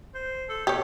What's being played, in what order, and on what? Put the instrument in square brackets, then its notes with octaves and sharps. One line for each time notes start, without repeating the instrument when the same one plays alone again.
[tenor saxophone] C5
A4
[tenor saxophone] B2 [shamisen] G4 C#5